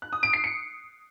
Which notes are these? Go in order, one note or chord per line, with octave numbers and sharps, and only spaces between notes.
F#6
D#6
D7
C7
C#7